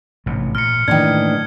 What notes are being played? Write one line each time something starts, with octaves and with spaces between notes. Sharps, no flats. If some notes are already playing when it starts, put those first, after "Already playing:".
A1 G#2 C3
A#2 F6 C#7
A2 D#3 E3 A#3 D4 G#6